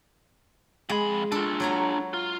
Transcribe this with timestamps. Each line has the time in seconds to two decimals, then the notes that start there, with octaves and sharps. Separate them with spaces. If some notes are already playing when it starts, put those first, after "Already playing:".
0.89 F2 G#3 B5
1.32 D4 F4 A4
1.60 F#3 C#5 A#5
2.14 F4